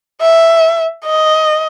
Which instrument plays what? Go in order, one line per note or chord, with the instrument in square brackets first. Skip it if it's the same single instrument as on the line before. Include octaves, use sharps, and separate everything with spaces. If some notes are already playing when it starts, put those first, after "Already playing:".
[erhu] E5
D#5